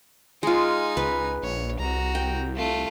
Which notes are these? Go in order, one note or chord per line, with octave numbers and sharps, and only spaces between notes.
G#3 D#4 F4 G#5
C#2 B4
A#1 C#5
C2 F#4 A#5
G5
A3 F4